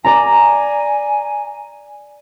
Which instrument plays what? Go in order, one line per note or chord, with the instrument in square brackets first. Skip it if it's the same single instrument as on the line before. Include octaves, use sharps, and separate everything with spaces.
[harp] D5 A#5 [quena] G#5